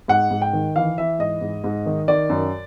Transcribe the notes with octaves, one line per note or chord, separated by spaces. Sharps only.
G#2 F#5
G#2
G5
D#3
E3 F5
E3 E5
G#2 D#5
G#2
G#2
D#3
D#3 D5
F#2